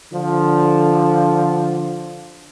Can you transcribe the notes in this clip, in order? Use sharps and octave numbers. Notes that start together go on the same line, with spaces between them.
D3 F3